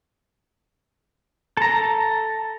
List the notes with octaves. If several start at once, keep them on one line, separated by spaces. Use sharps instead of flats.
A4 A#5